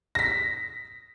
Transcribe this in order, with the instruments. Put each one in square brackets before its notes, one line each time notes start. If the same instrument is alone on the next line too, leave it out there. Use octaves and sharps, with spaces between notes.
[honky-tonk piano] A#6 B6